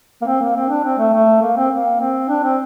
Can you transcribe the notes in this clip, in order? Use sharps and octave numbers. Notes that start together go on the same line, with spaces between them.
A#3
C4
A#3
C4
D4
C4
A3
A3
A#3
C4
A#3
C4
D4
C4